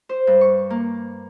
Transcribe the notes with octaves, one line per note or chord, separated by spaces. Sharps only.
C5
G2
C#6
A#3